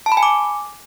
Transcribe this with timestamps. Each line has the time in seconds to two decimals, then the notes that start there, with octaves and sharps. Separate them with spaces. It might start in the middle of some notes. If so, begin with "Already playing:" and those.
0.06 A5
0.12 B5
0.17 G#5
0.23 D6